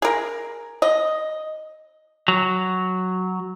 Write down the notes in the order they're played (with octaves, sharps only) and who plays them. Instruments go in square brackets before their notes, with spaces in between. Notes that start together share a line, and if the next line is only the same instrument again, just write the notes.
[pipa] G#4 A#4
D#5
[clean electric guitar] F#3